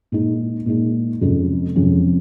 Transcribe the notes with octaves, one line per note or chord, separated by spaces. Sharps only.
A#2 G#3 D#4
A#2 G#3 D#4
F2 C3 F3 G#3 C#4
F2 C3 F3 G#3 C#4